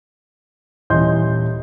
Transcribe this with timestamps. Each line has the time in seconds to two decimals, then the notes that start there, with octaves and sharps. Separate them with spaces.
0.90 D#1 E3 D#5 C6 G6